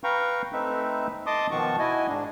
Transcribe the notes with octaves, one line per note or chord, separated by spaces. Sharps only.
B4 F5 G5 A#5 C#6
A3 C4 D#4 B4 E5
D#5 A5 C6 D6 D#6
B2 D#3 F3 F#4 A5 C#6
E4 F#4 D#5 G#5
G#2 D4